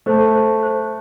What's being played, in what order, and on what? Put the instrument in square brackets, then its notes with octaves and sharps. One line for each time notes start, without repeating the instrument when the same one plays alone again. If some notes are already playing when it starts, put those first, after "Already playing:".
[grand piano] A3 [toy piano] C5
[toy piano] C5
C5